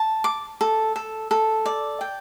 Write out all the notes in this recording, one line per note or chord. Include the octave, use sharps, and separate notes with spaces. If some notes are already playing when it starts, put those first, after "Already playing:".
Already playing: A5
D6
A4
A4
A4
D5
G5